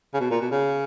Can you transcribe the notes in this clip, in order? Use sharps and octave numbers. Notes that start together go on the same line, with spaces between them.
C#3
B2
A#2
B2
C#3